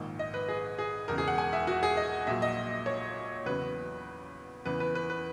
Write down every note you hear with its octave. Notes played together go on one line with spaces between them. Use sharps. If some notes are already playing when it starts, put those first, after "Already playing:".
Already playing: A#1 G#2 D#3
D#5
B4
G#4
G#4
E1 E2 C#3 A#4
G#4
F#5
G#5
E5
F#4
G#4
D#5
A#1 A#2 F#3 E5
D#5
C#5
E2 C#3 F#3 B4
E2 C#3 E3 B4
B4
B4
B4